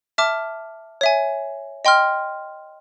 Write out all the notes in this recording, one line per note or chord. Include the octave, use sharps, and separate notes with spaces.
E5 A5 D6 F6
C#5 E5 G#5
D#5 G5 C6 F6